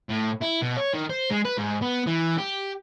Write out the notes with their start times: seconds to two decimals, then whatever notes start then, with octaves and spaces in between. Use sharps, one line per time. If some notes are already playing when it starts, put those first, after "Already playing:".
0.10 A2
0.42 E4
0.62 B2
0.77 C#5
0.93 D#3
1.09 C5
1.30 G#3
1.45 B4
1.58 G#2
1.82 B3
2.06 E3
2.38 G4